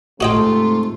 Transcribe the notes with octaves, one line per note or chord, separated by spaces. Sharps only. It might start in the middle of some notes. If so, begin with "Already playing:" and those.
G#2 C3 A3 F4 F#4 D#5 G5